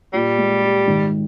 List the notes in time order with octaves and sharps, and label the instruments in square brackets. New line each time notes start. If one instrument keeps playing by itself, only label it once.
[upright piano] A#2 [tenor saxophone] G3
[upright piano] G#3
G4
G#1